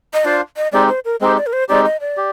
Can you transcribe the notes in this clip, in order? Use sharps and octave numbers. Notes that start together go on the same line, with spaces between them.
D#5
D4 F4 C5 D5 F5
D#5
G#3 C4 D#4 G4 D5
C5
A#4
G#3 C4 D#4 G4 C5
D5
A#4
C5
G#3 C4 D#4 G4 D5
D#5
D5
G4